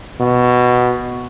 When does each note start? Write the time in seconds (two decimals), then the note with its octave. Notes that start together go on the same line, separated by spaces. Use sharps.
0.20 B2